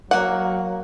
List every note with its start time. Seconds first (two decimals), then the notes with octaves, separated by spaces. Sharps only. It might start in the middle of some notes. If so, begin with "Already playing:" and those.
0.11 F#3 A#3 F#5